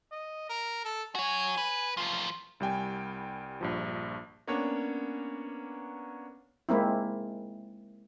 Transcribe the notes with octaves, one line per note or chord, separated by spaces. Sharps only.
D#5
A#4
A4
F#4 C#5 G#5
B4
F#2 F3 F4
C2 G3 G5 G#5
A#1 G2 F3
A#3 B3 C#4 D4 C#5
G#3 A#3 C4 E4